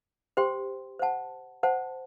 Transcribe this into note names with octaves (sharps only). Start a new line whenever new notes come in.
G4 C5 G5 C6
C5 F#5 A5
C5 F#5 A5